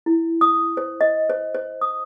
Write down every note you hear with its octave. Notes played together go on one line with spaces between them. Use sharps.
E4
D#6
C5
D#5
C5
C5
D#6